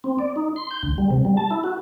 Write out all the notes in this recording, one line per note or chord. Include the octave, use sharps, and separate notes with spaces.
C4
D5
D#4
C6
G6
D2
G3
C3
G3
A5
E4
F#4